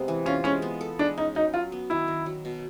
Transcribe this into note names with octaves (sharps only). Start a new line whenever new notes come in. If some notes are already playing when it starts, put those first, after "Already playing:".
Already playing: C3 G#3 B3
E3
C#4 F4
G#3 C#4
B3
A4
G#3 D4
C#4 D#4
F#3 D#4
F#3 F4
B3
D#3 E4
D#3
F#3
B2